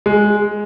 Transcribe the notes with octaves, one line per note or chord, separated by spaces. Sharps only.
G#3